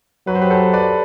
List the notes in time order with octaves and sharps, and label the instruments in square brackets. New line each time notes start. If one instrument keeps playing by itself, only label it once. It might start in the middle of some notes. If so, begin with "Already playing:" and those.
[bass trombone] F#3 [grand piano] B4
[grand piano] C5
G4 B4
A4 C5
B4 D5